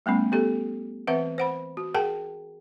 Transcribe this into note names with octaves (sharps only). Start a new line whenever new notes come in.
G3 A3 B3 C#4
B3 G4 A4
E3 C4 B4 E5 F#5
C5 F#5 B5
F#4
G#4 A#4 F#5 G5 A5